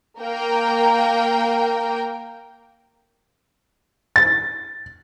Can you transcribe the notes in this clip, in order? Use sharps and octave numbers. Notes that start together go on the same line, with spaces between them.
A#3 A#4 G5
A6